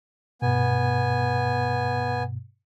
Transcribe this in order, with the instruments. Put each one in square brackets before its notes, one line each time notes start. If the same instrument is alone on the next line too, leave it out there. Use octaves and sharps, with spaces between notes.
[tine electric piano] G2 B2 [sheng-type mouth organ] B3 G#5